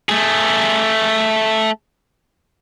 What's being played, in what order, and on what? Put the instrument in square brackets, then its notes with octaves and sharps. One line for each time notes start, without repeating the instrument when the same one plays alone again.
[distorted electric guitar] A3 G#4